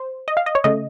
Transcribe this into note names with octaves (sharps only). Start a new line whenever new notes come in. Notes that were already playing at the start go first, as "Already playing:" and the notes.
Already playing: C5
D#5
F5
D#5
C#5
C#3 A3 D#5